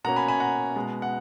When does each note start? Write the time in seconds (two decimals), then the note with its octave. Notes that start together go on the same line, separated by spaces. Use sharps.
0.04 B2 A#3 C#4 F#5 A#5
0.16 G#5 B5
0.28 G#5 B5
0.40 F#5 A#5
0.76 B2 G#3 B3
1.02 F#5